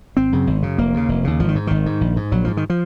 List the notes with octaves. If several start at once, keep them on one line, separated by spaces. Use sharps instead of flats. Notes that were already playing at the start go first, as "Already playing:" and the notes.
G#1 C4
F#2 C#3
G#1
F#2 C#3
F1 A#3
D#2 C#3
F1
D#2 C#3
G#1 F3
D#3
G#2
G#1 D#3
G#2
A#1
G#2
A#1 F#3
G#2 F3
D#3
F3